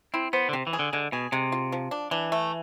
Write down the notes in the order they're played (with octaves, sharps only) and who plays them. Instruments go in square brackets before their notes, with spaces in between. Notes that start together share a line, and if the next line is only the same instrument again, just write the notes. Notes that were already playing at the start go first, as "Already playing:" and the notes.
[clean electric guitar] C4 [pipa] E4
[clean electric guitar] B3 [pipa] C5
[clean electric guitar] D3
[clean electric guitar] C3 [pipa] C4
[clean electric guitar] E3
[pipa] G#4
[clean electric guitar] D3
[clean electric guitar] D3 [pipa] G#3
[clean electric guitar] B2 [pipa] G#4
[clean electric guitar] C3 [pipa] G#3
[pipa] F4
F3
D4
[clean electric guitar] E3 [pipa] D4
[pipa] A3